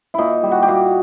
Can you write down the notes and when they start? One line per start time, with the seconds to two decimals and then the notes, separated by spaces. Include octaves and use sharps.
0.14 A#2 D#4 E4
0.43 G3
0.51 F#4
0.63 G4
0.68 A#2 F#4